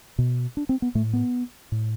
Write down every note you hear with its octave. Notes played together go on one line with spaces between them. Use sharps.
B2
D4
C4
B3
A2 A3
B3
A2